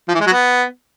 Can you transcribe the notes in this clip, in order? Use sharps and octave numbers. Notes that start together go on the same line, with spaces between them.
F3
E3
G#3
F#3
B3